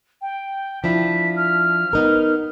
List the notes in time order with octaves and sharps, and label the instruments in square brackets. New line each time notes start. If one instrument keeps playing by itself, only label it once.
[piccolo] G5
[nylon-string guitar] F3 D4 E4 [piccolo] B6
[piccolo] F6
[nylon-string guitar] B3 D#4 A#4